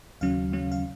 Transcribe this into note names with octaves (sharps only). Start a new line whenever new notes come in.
D#2 C#3 F#3 C#4 F5
D#2 C#3 F#3 C#4
F5